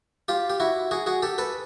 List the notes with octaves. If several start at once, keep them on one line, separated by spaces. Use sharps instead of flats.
F4 G4
G4
E4 F#4
F#4 G#4
F#4 G#4
G4 A4
A4 B4